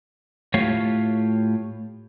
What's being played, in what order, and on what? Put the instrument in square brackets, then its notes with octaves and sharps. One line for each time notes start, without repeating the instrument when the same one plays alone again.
[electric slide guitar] A2 A3 F4 G4 C#5 F5